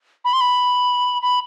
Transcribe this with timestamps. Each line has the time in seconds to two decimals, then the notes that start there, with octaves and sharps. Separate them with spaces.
0.25 B5
0.33 C6
0.41 B5
1.22 B5